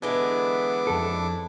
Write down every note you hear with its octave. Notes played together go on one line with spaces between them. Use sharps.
D3 E3 G#3 B3 D4 E4 G#4 D6
F2 A4